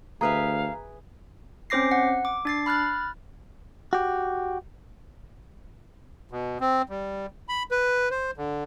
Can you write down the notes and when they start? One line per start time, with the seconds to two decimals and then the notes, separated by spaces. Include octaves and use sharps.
0.21 D2 G#4 B4 E5 F5 A#5
1.70 C4 C#4 C5 D6 A#6 C7
1.91 F#5
2.25 D6
2.45 D4 A6 C7
2.66 B5 F6 F#6 A6
3.93 F#4 G4
6.32 B2
6.61 C4
6.89 G3
7.49 B5
7.71 B4
8.11 C5
8.37 D3